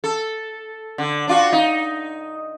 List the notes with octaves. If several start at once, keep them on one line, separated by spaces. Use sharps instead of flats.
A4
D3
D4 F4 F#4
D#4